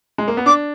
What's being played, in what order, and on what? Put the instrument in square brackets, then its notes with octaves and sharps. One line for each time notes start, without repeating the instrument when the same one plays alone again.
[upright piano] G#3
A#3
B3
[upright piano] D4 [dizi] D6